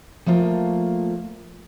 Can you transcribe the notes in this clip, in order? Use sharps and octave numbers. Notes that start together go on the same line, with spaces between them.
F3 A3 A#3 F4